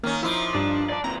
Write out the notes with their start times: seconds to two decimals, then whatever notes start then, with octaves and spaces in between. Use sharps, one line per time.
0.03 D#3 A#3 C#4
0.23 A#2 F3 D#4 E4 C6 D6
0.55 G2 D4
0.90 D5 A5
1.04 D#2 C4 A#5